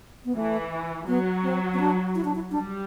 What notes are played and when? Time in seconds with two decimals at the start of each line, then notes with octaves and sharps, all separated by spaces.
0.25 B3
0.35 E3 A3
1.07 F#3 B3
1.43 C4
1.73 C4
1.79 D4
2.15 E4
2.24 D4
2.35 E4
2.51 G3 D4